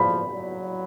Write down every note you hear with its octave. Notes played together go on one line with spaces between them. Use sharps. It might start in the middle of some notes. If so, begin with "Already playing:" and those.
Already playing: F3 B5
F#3